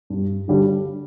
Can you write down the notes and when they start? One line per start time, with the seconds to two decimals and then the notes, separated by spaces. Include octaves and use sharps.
0.10 G2
0.48 D3 G3 D4